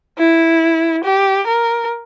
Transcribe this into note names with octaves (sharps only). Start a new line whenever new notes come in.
E4
G4
A#4